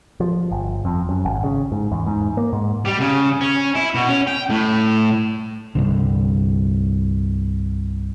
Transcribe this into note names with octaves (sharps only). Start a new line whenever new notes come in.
F3
G1
F2
F#2
G#1
C#3
G#2
E2
G#2
A#3
G#2
G3
C#3
C#4
E4
B2
C#4
G5
A2
C2 G2 D3